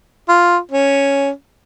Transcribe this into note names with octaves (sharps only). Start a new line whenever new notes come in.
F4
C#4